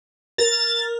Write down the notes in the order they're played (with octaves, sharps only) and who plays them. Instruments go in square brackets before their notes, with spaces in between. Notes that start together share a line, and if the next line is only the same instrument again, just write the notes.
[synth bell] A#4 [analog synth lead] A6